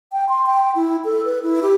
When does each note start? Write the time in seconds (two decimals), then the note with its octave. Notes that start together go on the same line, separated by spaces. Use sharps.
0.12 G5
0.29 C6
0.46 G5
0.75 E4
1.05 A4
1.25 B4
1.43 E4
1.62 G4